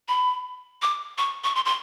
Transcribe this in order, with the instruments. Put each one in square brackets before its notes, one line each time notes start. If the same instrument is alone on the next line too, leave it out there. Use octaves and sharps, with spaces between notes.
[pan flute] B5
D6
C#6
C#6
C6
C6